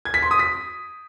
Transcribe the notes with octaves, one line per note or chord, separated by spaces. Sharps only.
G#6
B6
C6
D#6
B6